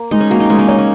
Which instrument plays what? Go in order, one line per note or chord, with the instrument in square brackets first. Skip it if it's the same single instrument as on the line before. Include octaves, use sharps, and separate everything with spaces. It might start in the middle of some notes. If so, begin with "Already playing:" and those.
Already playing: [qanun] A#3
[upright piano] G#3 [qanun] D#4
[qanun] C#4
[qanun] A#3 [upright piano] F#4
[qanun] D#4
[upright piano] G#3 [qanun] C#4
[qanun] A#3
[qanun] D#4 [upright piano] C#5
[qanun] C#4